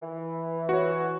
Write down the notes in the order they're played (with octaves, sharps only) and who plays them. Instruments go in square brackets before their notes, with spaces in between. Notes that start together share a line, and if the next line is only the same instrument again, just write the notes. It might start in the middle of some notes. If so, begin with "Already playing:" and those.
[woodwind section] E3
[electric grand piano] F#4 C#5